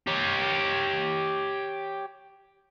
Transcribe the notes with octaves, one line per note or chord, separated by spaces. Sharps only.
G4 C#5